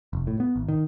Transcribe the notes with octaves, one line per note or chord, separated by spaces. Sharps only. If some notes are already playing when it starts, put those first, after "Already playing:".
F1
A2
B3
G#1
D#3